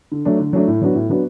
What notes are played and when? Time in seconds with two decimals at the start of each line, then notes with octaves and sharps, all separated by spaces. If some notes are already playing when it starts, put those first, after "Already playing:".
0.12 D3
0.25 F#3 A3 D4
0.39 D3
0.53 F#3 A3 D4
0.68 A2
0.81 F#3 B3 D4 F#4
0.95 A2
1.09 F#3 B3 D4 F#4